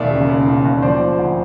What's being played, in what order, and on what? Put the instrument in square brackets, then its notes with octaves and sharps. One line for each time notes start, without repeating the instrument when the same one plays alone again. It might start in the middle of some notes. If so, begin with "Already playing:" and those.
Already playing: [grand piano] E1 D#2 D5 E5
C#3
C#3
E1
D#2
F3 C5 D5
F3
D2